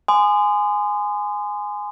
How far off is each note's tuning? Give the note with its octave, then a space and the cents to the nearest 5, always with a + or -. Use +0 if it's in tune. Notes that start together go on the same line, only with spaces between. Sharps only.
G#5 +0 C6 -30 D#6 -35